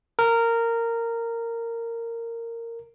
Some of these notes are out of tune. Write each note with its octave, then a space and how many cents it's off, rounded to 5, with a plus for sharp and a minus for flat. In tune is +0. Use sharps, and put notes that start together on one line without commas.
A#4 -15